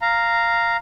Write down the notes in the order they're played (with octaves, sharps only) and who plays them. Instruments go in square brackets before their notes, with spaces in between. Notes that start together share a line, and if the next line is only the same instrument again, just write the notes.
[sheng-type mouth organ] F5 A#5